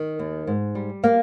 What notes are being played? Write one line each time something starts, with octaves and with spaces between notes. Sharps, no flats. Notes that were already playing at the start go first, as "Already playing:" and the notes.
Already playing: D#3
D#2
G#2
G3
A#3 F5